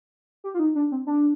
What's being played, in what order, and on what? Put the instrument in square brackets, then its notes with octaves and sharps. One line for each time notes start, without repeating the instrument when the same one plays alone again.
[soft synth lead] G4
F4
D#4
D4
C4
D4